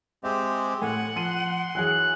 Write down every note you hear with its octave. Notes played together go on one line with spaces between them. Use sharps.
G#3 C4 G4 E5
A2 F#5 G#5
F3 C6 D#7
E3 F#3 G#4 F#6